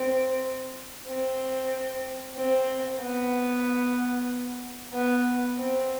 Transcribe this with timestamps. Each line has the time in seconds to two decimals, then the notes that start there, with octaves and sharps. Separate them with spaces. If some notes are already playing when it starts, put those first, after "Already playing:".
Already playing: C4
1.07 C4
2.36 C4
2.99 B3
4.93 B3
5.58 C4